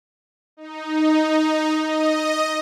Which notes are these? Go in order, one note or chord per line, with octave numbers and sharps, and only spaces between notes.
D#4
D#5